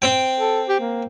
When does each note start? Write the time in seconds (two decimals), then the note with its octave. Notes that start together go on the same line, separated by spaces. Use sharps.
0.02 C4 G5
0.40 A4
0.69 G4
0.80 A#3